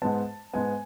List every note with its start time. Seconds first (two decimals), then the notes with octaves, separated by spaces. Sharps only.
0.02 G#2 G#3 B3 A5
0.53 G#2 G#3 B3 G#5